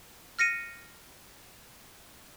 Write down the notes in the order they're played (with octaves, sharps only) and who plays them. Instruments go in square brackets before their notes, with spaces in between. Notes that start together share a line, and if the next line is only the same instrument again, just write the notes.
[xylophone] F6 A#6 C#7 D#7